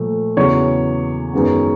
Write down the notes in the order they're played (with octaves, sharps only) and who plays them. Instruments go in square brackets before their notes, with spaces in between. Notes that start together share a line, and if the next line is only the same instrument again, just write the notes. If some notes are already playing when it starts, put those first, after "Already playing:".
Already playing: [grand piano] A#2 F3 A3
E2 C#3 F#3 C#5
F#2 D#3 G#3 B3